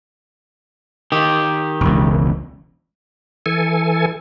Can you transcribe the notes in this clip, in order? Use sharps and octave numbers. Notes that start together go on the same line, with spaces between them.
D#3 G4
E1 C#2
E3 A4 G#5